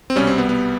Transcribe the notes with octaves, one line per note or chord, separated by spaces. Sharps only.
C4
C2 B2 G3 C#4
C4
B3
B3